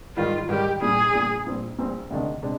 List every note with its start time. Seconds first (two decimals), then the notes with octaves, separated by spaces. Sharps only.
0.16 G#2 D#3 G3 F4
0.49 G#2 D#3 G3 G4
0.81 A#1 A#2 G3 G#4
1.13 A#1 A#2 G3
1.46 A#1 A#2 G3 C4
1.79 A#1 A#2 G3 C4
2.11 D2 C3 D#3 G#3 D4
2.43 C3 G#3 D4